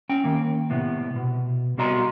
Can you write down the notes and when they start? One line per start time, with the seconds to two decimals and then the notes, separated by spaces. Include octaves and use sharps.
0.09 C#4 G5
0.24 D#3 A#3
0.70 A2 C3 B3
1.16 B2
1.78 C2 B2 F#4 D#5 A#5 C6